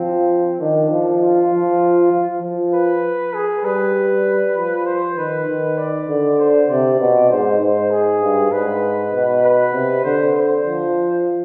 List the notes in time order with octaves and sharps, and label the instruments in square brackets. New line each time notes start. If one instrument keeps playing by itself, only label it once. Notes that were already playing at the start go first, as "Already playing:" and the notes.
Already playing: [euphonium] F3 [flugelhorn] C4
[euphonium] D#3 [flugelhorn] D4
[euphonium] F3
[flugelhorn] F4
[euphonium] F3
F3
F3
[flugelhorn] B4
G#4
[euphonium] G3 [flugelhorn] B4
[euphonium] F3
[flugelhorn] C5
[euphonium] D#3 [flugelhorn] B4
[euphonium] D#3
[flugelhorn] D5
[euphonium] D3
[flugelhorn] C5
[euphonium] C3 [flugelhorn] D5
[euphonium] B2
[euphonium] G#2 [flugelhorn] C5
[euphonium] G#2
[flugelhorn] G#4
[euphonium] G2
[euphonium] G#2 [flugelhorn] B4
[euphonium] B2
[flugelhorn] B4
[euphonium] C3
[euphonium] D3 [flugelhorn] C5
[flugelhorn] C5
[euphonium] F3